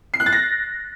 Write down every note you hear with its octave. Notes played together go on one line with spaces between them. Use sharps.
C7
F#6
A6
A#6